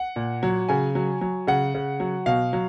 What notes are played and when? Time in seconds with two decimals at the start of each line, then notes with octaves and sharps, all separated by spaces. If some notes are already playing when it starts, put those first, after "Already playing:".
Already playing: F#5
0.16 A#2
0.43 F#3
0.69 C#3 G#5
0.95 F#3
1.21 F#3
1.47 C#3 F#5
1.75 C#3
2.00 F#3
2.26 B2 F5
2.53 F#3